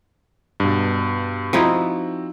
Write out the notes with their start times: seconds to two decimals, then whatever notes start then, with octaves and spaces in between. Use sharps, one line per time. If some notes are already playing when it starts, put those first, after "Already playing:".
0.60 G2 B2
1.53 F3 C4 D#4 E4 F#4